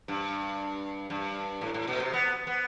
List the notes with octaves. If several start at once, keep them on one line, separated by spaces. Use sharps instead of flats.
G2
G2
A2
A2
B2
C3
B3
B3